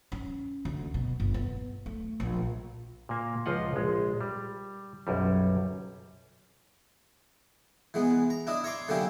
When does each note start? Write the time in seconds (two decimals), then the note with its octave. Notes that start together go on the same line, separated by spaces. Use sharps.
0.12 C#4
0.65 D2
0.94 B2
1.20 G1
1.34 B3
1.86 A3
2.20 A#1
3.09 A#2 A#3
3.46 C#2 F3 F4 D#5 F#5
3.76 A#1 G#3
4.21 G3
5.07 B1 F#2 G3
7.94 E3 G#3 B3
8.30 A#5
8.47 D4 E4 D#5
8.64 C#5 A#5 C6 D6
8.89 D3 F#3 A#3 C#4 E4 G4